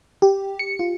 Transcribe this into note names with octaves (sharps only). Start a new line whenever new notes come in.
G4
C#7
F4